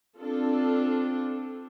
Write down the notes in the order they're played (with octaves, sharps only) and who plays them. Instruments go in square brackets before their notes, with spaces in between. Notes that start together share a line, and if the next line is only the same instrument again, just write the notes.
[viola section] C4 D4 F4 A4